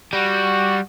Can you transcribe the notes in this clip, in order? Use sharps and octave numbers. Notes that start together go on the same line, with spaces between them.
G3 F#4